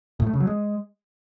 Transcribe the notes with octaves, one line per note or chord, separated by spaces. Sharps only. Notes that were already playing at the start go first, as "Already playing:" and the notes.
A2
A3
C#3
F#3
G#3